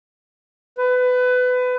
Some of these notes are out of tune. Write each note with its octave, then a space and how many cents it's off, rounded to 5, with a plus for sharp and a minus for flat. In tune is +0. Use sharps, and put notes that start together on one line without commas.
B4 +25